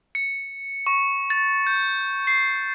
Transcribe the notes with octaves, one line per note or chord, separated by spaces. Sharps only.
C#7
C#6
A6
G6
C7